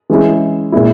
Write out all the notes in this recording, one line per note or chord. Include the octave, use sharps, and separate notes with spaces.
E3 G#3 C#4 E4
A#2 G#3 E4